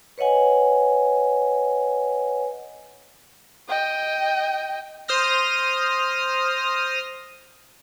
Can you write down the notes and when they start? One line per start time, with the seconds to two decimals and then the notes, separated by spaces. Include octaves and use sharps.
0.18 B4 C#5 D#5 F#5 G#5
3.68 D#5 G5
5.08 C5 D#6 F6 A#6